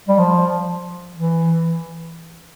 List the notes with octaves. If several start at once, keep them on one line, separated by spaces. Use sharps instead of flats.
G3
F3
E3